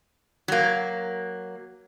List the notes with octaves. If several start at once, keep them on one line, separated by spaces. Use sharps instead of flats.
F#3 A#3